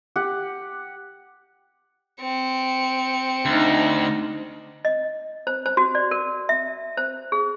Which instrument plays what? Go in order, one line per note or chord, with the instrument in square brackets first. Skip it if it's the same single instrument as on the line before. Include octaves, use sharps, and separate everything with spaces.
[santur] G4 F#5
[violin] C4 C#7
[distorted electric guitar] D2 [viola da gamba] D4 D#4
[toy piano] D#5
C5
C5
F#4
D5
A#4
E5
C5
G#4